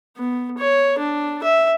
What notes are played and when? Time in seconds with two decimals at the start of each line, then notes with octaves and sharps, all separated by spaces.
0.17 B3
0.58 C#5
0.99 D4
1.44 E5